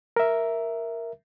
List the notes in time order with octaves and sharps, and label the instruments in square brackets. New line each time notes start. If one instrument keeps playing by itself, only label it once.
[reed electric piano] A#4 E5